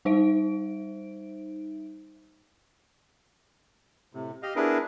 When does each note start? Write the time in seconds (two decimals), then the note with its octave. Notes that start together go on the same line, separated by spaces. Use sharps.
0.05 G3 D#4 C5 E5 D7
4.13 A2 C3
4.42 G4 D#5 F5
4.56 B3 D4 E4 G#4 A#4 B4